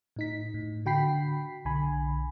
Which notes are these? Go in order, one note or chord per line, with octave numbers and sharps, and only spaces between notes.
A2 D#4 B6
A2
D3 F#4 G5 B5 B6 C7
B1 D3 G#5 B5